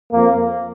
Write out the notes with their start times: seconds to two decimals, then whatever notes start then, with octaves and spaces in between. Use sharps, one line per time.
0.12 F2 F3 A#3